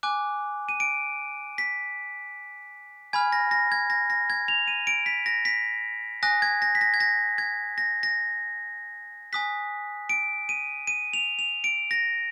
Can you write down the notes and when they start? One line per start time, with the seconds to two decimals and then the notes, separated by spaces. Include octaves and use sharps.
0.03 G#5 D6 F#6
0.69 D#7
0.80 D7
1.58 B6
3.13 G#5 B5 F6 G#6
3.32 A#6
3.51 A#6
3.72 G#6
3.90 A#6
4.10 A#6
4.30 G#6
4.48 F7
4.68 D#7
4.87 D7
5.06 B6
5.26 A#6
5.45 B6
6.23 G#5 D#6 F#6 A#6
6.42 G#6
6.62 A#6
6.75 B6
6.81 A#6
6.94 G#6
7.00 A#6
7.38 G#6
7.78 A#6
8.03 A#6
9.33 G#5 D#6 F#6 B6
10.09 D7
10.49 D#7
10.87 D#7
11.13 F7
11.39 F7
11.64 D7
11.91 A#6